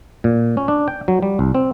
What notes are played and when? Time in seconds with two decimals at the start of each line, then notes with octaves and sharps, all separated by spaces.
0.24 A#2
0.57 C#4
0.68 D4
0.88 G5
1.08 F#3
1.23 G3
1.39 C2
1.54 C4